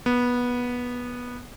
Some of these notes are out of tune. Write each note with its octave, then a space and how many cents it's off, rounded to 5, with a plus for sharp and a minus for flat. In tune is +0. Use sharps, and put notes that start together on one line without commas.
B3 -15